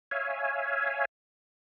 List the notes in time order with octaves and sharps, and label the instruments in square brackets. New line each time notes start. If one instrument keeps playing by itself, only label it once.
[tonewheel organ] C#5 E5 F5 G#5